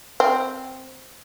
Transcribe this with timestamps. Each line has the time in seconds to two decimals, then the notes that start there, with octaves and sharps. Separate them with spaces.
0.20 C4